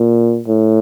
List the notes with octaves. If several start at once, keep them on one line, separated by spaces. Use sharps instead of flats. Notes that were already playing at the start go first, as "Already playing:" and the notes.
Already playing: A#2
A2